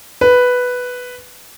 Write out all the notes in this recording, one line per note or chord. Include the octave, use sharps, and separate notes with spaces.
B4